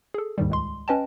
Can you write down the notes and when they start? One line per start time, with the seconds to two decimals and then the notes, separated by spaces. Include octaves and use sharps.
0.14 G#4 A4
0.38 D#2 G#2 D#3 G3
0.50 C#2 G#3 C6
0.88 C#4 B4 D#5 G5 A5